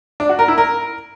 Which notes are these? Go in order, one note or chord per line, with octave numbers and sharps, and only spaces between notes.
D4
F#4
A#4
E4
A#4